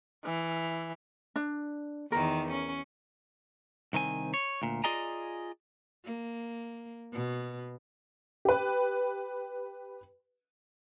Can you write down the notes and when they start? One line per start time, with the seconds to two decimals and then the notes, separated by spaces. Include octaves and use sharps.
0.25 E3
1.36 D4
2.12 E2 D#3 A#4
2.52 C#4
3.93 C2 D#3 C4 G#5
4.34 C#5
4.62 D2 A#2
4.84 F4 G#4 D5 D#5 G#5 A#5
6.04 A#3
7.12 B2
8.45 G4 B4